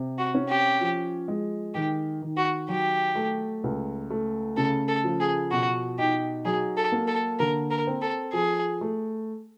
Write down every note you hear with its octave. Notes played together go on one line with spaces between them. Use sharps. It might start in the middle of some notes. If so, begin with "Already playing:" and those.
Already playing: C3
F#4
C#4
G4
F3
G#3
D#3 G4
D#3
F#4
F#3 G4
A3
C#2
A3
C#3 A4
A4
F3
G#4
B2 F#4
D#4 G4
F#3 G#4
A4
A#3
A4
D3 A#4
A#4
C4
A4
F3 G#4
A3